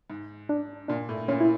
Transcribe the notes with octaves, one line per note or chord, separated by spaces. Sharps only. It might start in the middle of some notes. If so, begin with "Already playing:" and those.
G#2
D4
A#2 D4
A2
A#2 C#4
E4